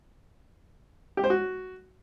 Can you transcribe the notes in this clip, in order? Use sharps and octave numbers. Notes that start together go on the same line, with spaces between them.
G4
C5
F#4